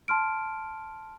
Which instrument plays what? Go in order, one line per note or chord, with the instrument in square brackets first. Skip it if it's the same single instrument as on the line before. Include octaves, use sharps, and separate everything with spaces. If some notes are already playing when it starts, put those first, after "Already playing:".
[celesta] A5 C6 F6 D7